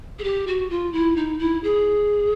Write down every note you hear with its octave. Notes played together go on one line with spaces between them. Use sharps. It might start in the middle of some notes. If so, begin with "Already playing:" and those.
G#4
G4
F#4
F4
E4
D#4
E4
G#4